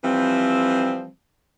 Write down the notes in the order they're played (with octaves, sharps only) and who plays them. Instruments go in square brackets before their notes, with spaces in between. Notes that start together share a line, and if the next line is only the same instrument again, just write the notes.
[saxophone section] E3 F3 G3 C4